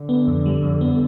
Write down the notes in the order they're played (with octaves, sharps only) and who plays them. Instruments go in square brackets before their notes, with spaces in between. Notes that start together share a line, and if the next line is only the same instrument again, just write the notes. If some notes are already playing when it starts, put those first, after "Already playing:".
Already playing: [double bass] D3
[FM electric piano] B3
F2
G3
F2
B3